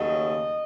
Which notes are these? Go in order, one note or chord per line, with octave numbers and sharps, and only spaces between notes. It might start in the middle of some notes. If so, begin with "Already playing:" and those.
Already playing: D#2 C#3 F#3 A3 D#5